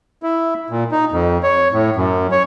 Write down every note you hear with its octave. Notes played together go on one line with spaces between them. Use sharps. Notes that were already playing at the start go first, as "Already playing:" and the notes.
E4
A#2
D#4
F2
C#5
A2
F#2
C#5